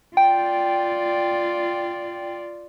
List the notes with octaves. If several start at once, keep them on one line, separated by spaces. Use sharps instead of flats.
F4 D5 G5